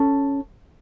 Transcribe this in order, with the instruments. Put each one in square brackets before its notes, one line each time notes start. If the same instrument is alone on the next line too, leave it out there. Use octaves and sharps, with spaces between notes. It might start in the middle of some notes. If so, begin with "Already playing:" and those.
Already playing: [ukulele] C#4 A4